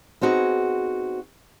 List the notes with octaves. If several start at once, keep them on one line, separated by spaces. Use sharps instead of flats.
B3 C4 D#4 F#4 G#4